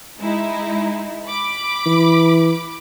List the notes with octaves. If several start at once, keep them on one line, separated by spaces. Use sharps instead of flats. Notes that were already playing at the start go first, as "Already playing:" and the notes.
G#3 D#4 E4
B5 D6
E3